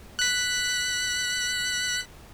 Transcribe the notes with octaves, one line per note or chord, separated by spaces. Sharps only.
F#6 B6